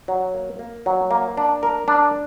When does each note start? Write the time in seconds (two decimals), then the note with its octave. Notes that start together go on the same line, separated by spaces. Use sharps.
0.08 F#3
0.34 A#3
0.59 A#3
0.86 F#3
1.11 A#3
1.37 D4
1.63 A#4
1.88 D4